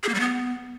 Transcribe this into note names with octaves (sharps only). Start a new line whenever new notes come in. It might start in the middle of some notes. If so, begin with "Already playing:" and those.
G#4
A#3
G3
B3